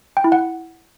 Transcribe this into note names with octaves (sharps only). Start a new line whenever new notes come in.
G5
E4
F#5